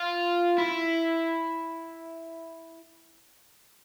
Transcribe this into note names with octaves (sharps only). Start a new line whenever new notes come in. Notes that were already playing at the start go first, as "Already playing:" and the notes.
Already playing: F4
E4